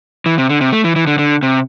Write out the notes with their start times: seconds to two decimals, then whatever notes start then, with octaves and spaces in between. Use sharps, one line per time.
0.26 E3
0.38 C3
0.49 D3
0.61 C3
0.72 A3
0.84 E3
0.96 E3
1.07 D3
1.19 D3
1.43 C3